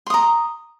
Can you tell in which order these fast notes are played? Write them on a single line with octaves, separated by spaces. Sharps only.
C6 D#6 A#5